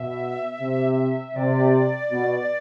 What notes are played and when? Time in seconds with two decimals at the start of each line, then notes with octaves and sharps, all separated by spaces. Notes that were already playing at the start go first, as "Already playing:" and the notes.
Already playing: B2 E5
0.61 C3
1.35 C3 D5
2.11 B2